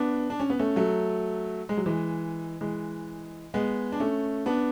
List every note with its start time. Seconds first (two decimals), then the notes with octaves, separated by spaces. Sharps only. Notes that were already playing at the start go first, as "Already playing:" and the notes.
Already playing: B3 D4
0.30 D4
0.40 C#4
0.50 B3
0.59 A3 C#4
0.76 F#3 A3
1.69 G#3
1.77 F#3
1.86 E3 G#3
2.61 E3 G#3
3.54 G#3 B3
3.92 D4
4.00 A3 C#4
4.46 B3 D4